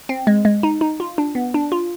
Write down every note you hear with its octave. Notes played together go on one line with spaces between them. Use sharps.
C4
G#3
G#3
D#4
D#4
F4
D4
B3
D4
F4